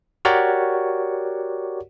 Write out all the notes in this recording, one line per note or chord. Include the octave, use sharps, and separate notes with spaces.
F#4 G4 A#4 C#5 D5 F#5